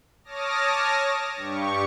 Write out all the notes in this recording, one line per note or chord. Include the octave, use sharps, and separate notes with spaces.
C#5 A5 D6 D#6 F6 A#6
G2 G4 C#6